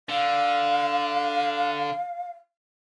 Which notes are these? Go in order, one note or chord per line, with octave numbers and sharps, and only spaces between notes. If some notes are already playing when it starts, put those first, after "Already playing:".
D3 F5